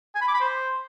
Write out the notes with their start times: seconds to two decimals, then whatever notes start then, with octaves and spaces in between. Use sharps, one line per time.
0.15 G#5
0.21 B5
0.28 D6
0.34 B5
0.41 C5